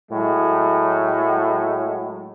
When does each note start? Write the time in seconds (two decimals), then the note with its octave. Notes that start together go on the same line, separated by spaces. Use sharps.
0.11 A2 F#3 G#3